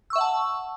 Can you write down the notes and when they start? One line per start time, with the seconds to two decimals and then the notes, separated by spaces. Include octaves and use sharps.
0.10 E6
0.13 C#6
0.16 E5
0.18 F#5
0.21 A5